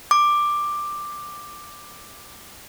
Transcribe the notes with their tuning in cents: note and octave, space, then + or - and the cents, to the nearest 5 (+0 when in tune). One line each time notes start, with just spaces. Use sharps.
D6 +10